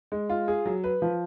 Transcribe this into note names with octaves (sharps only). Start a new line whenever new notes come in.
G#3
F4
G#4
F#3
B4
F3